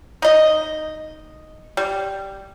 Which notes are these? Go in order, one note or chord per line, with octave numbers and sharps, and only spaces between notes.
D#4 D#5
G3